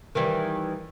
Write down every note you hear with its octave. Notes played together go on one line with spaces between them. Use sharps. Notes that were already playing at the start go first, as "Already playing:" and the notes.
D#3 E3 G3